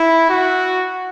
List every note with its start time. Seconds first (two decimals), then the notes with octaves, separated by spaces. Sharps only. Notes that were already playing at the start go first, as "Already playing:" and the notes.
Already playing: E4
0.30 F#4